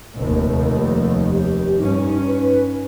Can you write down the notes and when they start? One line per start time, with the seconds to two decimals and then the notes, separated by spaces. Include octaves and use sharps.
0.17 F1 D#2
1.32 G4
1.78 G2 C#4 D#4
2.27 B4